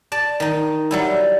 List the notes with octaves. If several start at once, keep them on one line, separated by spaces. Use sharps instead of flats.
D5 A5
D#3 D#4
F#3 G3 E4